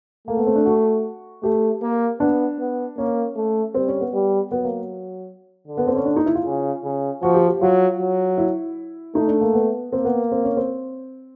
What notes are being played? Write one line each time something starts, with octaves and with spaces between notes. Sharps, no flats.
A3 A#3
B3
C4
D4
F#4
A3 G4
A#3
B3 D4
B3
A#3 C#4
A3
G3 C4
C#4
B3
G3
F#3 B3
A#3
D3
B3
C4
C#4
D4
D#4
E4
F4
C#3
C#3
F3 F#4
G4
G4
F#3 F4
F#3
E4
A3 D#4
D4
A#3
B3
A#3 C4
B3
C4
C#4
C4